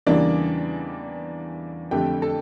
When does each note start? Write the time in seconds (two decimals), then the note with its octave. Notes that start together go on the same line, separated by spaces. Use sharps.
0.06 E2 C#3 E3 G3 A#3 D4 D5
1.91 F2 D3 A3 G4 G5
2.22 A4 A5